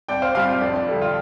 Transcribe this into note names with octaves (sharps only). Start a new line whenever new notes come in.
C2 D5 G5
C5 F5
C3 G3 C5 F5
F4
F2 D4
D4
D3 G3
F4